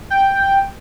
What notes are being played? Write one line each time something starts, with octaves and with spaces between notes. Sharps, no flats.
G5